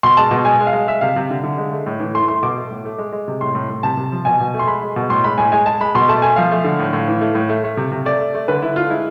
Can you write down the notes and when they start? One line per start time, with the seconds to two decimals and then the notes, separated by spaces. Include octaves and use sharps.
0.03 B2 C6
0.17 G#3 A5
0.31 B2
0.45 G#3 G#5
0.60 G#3
0.67 F5
0.73 G#3
0.87 G#3 E5
1.01 C3 F5
1.16 C3
1.30 D3
1.44 D3
1.58 G#3
1.72 A3
1.86 A2
2.00 E3
2.14 A3 C6
2.28 A3 C6
2.43 B2 D6
2.56 A3
2.71 A2
2.85 A3
2.98 G#3
3.12 G#3
3.28 C3
3.41 A2 C6
3.55 A2
3.69 A2
3.83 C3 A5
3.97 C3
4.12 F3
4.25 B2 G#5
4.40 B2
4.54 A3
4.59 C6
4.67 G#3 B5
4.82 G#3
4.96 B2
5.10 A2 C6
5.24 G#3 B5
5.38 A2 G#5
5.52 G#3 G#5
5.66 G#3 A5
5.80 G#3 B5
5.95 B2 C6
6.08 A3 A5
6.22 A3 G#5
6.36 F3 F5
6.52 A3
6.64 D3
6.79 A2
6.93 A2
7.08 E3
7.21 A3
7.35 A2
7.49 A3
7.64 A3
7.77 C3
7.91 C3
8.05 A3 D5
8.21 A3
8.35 A3
8.48 D3 B4
8.62 D3 E4
8.76 A3 F4
8.90 G#3 E4